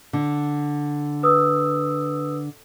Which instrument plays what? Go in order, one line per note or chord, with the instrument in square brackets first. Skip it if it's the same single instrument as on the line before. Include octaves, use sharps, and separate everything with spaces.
[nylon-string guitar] D3
[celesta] B4 D#6 E6